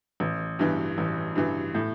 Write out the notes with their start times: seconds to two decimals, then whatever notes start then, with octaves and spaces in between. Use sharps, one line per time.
0.20 A1
0.59 G2 E3
0.98 A1
1.36 G2 E3
1.75 A2